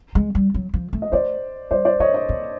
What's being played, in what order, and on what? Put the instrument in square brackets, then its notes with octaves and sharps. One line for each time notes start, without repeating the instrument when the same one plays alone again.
[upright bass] G#3
G3
F#3
F3
A3
[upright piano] D#5
[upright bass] A3 [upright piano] C5 D5
[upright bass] G3 [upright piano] C5 D5
[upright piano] C5 D5
[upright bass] A3 [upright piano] C#5 D#5
[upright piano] C#5 D#5
[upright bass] A#3